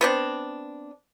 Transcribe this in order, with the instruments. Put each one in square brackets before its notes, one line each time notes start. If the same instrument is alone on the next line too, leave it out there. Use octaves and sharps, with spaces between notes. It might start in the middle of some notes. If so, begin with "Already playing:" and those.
[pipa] B3 C4 D4